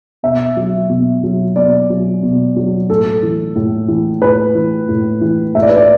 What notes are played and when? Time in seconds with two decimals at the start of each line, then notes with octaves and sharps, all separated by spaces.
0.23 B2 E5
0.57 F#3
0.89 B2
1.23 F#3
1.56 B2 D5
1.90 F#3
2.23 B2
2.56 F#3
2.89 A2 A4
3.23 E3
3.56 A2
3.88 E3
4.22 A2 B4
4.55 E3
4.89 A2
5.21 E3
5.55 A2 E5
5.62 D5
5.69 B4
5.77 D5